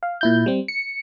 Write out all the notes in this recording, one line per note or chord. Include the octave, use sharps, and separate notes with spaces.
F5
A#2 E4 G6
G3 C4
C#7